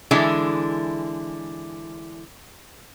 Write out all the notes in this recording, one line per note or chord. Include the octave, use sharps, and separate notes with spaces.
D3 E3 G#3 D4 E4